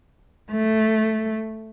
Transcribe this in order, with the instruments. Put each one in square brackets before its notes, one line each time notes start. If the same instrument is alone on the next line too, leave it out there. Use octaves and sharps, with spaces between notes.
[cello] A3